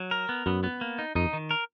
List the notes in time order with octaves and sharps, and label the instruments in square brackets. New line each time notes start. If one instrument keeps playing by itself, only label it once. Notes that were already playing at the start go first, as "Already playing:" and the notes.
Already playing: [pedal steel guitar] F#3
A#4
B3
[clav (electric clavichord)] F#2 [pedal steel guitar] B3
[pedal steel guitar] B3
A#3
D#4
[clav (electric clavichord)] F2 [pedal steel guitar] D#4
[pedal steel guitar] D#3
A#4